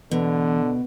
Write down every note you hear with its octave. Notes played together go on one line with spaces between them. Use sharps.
B2 D3 E3